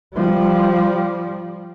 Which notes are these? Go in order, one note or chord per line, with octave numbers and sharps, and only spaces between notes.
F3 G3